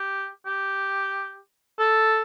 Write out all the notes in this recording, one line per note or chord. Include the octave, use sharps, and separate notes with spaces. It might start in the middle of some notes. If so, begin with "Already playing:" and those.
Already playing: G4
G4
A4